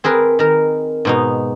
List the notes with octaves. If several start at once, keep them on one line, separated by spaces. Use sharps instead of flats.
C4 G#4 A#4 B4
D#3 A#4
G#2 B2 D#4